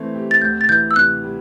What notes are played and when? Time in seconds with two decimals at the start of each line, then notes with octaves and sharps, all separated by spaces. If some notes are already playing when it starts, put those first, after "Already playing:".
Already playing: E3 A3 C4
0.15 G4
0.31 A6
0.41 D2 G6
0.61 A6
0.69 E3 G6
0.91 E6
0.96 C3 F#6
1.23 G3